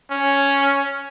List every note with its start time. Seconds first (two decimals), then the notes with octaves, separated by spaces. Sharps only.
0.11 C#4